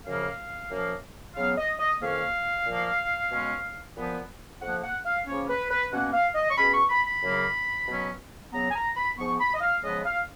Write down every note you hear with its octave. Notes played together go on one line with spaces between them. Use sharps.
F#2 C#3 F3 A#3 F5
F#2 F3 A#3
C#3 F#3 B3 F5
D#5
D#5
F2 D#3 A#3 C#4 F5
A#2 F3 A#3
B2 G#3 C#4
A#2 F3 B3
F2 F3 A#3 F#5
F#5
F5
C#3 F3 A#3 C#4 C#5
B4
B4
B2 A#3 C#4 F#5
F5
D#5
C#6
B2 G#3 C#4 B5
C#6
B5
B5
F#2 C#3 F#3 A#3
B2 F#3 C#4
C#3 F#3 B3 A#5
G#5
A#5
B5
G#2 F3 B3 C#6
B5
D#5
F5
C#3 F3 G#3 B3 D#5
F5